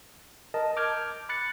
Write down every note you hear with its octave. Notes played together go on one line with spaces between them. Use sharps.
A#4 D#5 A5
A5 D6 F6 G6 G#6
B5 F#6 A6 C#7